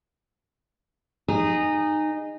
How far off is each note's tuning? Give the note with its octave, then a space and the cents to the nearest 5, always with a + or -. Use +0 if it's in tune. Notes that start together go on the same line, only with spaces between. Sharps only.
D#4 -15 G#4 -20